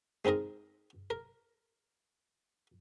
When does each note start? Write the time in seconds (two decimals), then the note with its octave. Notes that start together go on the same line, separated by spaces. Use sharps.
0.25 G#3 C4 D#4 A#4 D#5
1.10 A#4